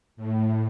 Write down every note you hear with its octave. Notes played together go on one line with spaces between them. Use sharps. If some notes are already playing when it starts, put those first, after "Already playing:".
A2